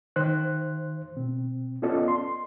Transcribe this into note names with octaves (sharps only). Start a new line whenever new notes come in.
D#3 C5 F#6
B2 C4
B3 C#4 F4 A4 D5 D#5
C6